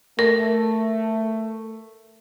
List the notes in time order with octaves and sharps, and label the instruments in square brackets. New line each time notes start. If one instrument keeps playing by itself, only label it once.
[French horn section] A3 [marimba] A#4